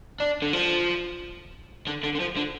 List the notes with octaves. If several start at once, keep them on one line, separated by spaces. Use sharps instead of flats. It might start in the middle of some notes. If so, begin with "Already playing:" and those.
D4
D3
F3
D3
D3
D3
F3
D3